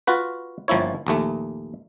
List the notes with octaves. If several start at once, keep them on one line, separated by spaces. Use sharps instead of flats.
F4 F#4 B4
G1 F3 A#3 E4 C#5
A#1 D#2 A3